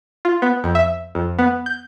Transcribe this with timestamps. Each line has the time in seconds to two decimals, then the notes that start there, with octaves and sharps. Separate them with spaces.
0.25 F4
0.42 B3
0.64 F2
0.75 E5
1.15 F2
1.39 B3
1.66 G6